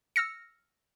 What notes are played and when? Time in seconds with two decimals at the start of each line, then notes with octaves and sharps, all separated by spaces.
0.16 E6 F6 A#6 C#7